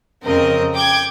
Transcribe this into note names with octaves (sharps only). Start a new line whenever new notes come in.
F2 C#3 C4 A#4 D#5
G5 D6 G6 G#6